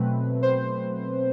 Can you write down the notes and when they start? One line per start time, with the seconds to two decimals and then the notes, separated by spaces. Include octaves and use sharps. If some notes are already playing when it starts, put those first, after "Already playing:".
Already playing: B2 F#3 A3 C4 B4
0.43 C5